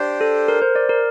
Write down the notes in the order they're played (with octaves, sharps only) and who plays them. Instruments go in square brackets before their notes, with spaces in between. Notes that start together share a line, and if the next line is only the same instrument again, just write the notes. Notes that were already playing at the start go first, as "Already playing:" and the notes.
Already playing: [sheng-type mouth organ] D4 G4 C5
[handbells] A4
A#4
C5
D5
A#4